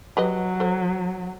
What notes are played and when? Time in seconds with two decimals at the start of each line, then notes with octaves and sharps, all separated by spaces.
0.17 F#3 G4 B4 D#5
0.60 A4 C5